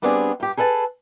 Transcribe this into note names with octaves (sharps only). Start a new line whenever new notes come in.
G3 B3 C4 D4 G4 G#4
G2 G4
G#4 A4 B4 E5 A5